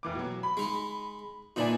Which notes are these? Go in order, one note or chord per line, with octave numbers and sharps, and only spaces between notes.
F1 E3 D6
B2 F#3
B5
G#3 D#4
A#2 E3 D4 D#4 D5 G#5